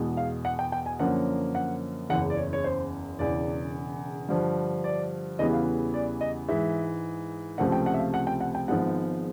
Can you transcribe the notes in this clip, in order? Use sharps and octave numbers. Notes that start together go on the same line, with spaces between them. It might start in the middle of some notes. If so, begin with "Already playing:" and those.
Already playing: E2 B2 G#3
F5
F#5
G5
G5
G#5
F#2 D3 F3 A#3 C#4 F#5
F#5
F#1 E2 C#3 F#5
D5
C#5
C#5
C5
E1 E2 C#3 D5
G2 D3 F3
D5
E2 C#3 E3 G3 B3 D#5
F5
D5
D#5
G#2 E3 G#3 E5
C#2 C3 F3 A3 C4 F#5
G5
F#5
E5
F5
F#5
G5
F#5
G5
G#1 G#2 F3 G#3 B3 F#5